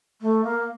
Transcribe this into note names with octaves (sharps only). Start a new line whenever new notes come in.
A3
A#3